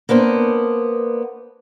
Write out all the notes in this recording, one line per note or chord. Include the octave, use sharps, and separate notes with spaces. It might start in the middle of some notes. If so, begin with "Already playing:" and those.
A#3 B3 D4 C5